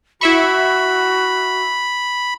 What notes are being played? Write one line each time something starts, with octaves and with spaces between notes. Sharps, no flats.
E4 F#4 E5 B5 C#6